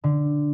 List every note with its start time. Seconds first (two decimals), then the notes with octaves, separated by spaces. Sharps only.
0.04 D3